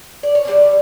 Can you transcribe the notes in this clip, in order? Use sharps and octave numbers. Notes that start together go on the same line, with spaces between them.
D5
C#5
D3 G3 C#4 D5